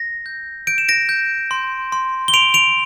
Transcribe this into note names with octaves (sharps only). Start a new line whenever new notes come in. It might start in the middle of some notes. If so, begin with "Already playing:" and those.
Already playing: A#6
G6
G6 D7
E7
A#6 D7
G6
C6
C6
G7
C6 D7 F7
D7 F7